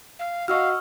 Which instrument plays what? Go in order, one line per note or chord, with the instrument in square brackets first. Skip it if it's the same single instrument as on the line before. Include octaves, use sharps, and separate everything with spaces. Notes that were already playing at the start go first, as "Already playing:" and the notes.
[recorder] F5
[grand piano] F#4 D#5 F#5 [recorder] F5 [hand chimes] C#6 E6 F6